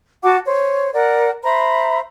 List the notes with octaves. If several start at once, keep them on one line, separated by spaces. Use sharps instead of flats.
F#4 F#5 A5 D6
C5 C#5
A#4 D5 F#5
C5 E5 A#5 B5